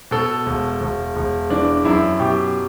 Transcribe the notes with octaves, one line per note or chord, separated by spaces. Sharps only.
B2 A4
E1
E1
E1
E3 D4
F#2 E4
B2 G4